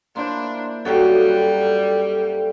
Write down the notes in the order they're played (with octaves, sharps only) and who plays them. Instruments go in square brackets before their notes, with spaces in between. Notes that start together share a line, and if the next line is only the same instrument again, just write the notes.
[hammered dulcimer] A#3 E4 C5 [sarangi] D4 [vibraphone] C6
[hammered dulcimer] F#2 F#4 [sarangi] G3 [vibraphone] A4 G5